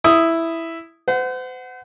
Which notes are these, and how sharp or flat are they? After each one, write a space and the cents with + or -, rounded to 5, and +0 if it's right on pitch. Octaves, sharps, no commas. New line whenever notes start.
E4 +0 D#6 +0
C5 -40 F#5 +0